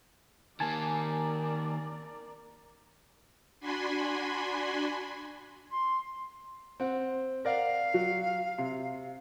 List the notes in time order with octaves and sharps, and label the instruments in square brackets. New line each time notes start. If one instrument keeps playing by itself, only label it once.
[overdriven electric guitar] D#3 A#3 [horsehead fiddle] A#4 D5 [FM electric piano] G#5 A5
[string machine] D4 F#4 G#5 B5 C6
[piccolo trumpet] C6
[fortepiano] C4 F#5
[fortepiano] A#4 D5 F#5 [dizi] F5
[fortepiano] F#3
C3